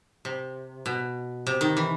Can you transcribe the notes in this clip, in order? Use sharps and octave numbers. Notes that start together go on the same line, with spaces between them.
C3
B2
C3
D#3
E3